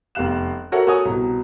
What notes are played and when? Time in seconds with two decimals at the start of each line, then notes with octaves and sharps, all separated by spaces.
0.15 F1 E2 G3 F5 F#6 E7
0.72 F#4 A4 A#4 C#5 E5 F#5
0.87 F#4 A4 C#5 G#5 D#6
1.05 C2 B2